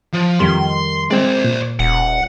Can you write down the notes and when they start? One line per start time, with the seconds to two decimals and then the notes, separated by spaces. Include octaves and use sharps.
0.14 F3
0.40 F2 D#3 G3 C6
1.11 G#3 C4 C5 D5
1.44 A#2
1.80 D#1 F#5